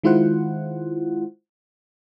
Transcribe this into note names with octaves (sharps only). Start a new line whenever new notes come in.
D#3 G#3 E4 F4 C5 F#5